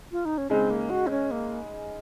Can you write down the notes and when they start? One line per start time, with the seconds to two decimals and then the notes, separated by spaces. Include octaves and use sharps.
0.12 F4
0.25 D#4
0.38 C#4
0.50 C#3 G#3 C4 D#4
0.70 A#3
0.90 F#4
1.07 C4
1.10 C#4
1.31 A#3